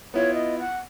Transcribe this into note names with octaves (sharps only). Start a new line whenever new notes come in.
B3 E4 F4 C#5
D#5
F#5